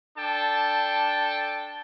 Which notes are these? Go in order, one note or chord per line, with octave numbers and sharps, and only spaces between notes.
D4 A4 G5 A5